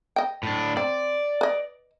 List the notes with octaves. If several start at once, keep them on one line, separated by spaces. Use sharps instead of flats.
D#5 G5
A2 D4
C4 D5
B4 D#5